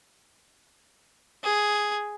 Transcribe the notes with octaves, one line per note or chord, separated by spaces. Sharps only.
G#4